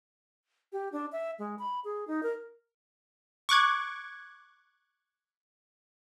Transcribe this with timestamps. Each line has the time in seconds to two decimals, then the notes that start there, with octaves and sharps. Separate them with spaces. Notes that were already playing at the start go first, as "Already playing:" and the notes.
0.73 G4
0.92 D4
1.12 E5
1.39 G#3
1.59 B5
1.84 G#4
2.08 D#4
2.23 A#4
3.49 C#6 D6 F#6 G#6